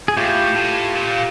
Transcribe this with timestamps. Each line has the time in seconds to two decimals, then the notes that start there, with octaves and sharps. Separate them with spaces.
0.08 G#4
0.17 A2 F4 G4
0.55 A2
0.94 A#2